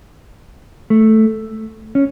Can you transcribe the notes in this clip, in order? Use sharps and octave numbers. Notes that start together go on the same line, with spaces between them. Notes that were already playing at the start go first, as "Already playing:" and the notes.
A3
C#4